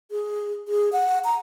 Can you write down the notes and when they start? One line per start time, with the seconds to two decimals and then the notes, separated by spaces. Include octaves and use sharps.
0.11 G#4
0.68 G#4
0.93 F#5
1.24 A#5